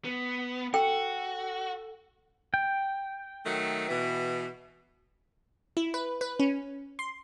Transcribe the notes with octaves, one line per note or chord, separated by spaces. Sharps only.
B3
F#4 A4 G5
G5
D#3 F#3 A3
B2 E3
E4
B4
B4
C#4
C6